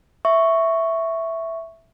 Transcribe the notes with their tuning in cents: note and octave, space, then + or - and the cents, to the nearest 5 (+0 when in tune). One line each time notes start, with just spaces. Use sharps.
E5 +0 C#6 +0